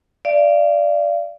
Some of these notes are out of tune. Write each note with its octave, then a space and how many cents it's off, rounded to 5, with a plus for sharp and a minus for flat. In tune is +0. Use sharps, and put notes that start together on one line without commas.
D5 +0 F5 -35